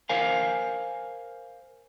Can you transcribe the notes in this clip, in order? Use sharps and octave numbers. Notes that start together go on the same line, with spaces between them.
A#4 C5 F5 G#5